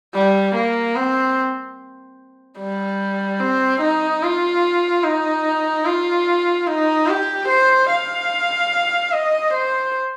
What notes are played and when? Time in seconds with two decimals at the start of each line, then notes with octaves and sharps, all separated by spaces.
0.14 G3
0.55 A#3
0.96 C4
2.59 G3
3.40 C4
3.81 D#4
4.23 F4
5.04 D#4
5.85 F4
6.67 D#4
7.08 G4
7.48 C5
7.90 F5
9.12 D#5
9.54 C5